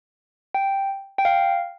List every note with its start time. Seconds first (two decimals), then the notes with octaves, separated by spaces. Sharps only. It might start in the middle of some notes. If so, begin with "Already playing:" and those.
0.55 G5
1.18 G5
1.25 F5